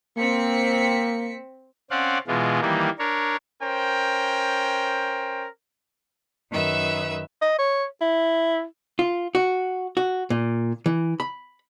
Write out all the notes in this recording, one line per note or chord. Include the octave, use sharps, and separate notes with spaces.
A#3 C4 B6 C#7
C4 C#4 D5 F5 F#5
B2 E3 G#3 F4
D#3 E3 G3 A#3
D4 A#4 C#5
C#4 A#4 C5 G5
F#2 D#3 B4 E5 E6
D#5
C#5
E4
F4
F#4
F#4
A#2
E3
B5